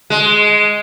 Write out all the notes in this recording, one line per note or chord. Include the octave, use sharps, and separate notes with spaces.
G#3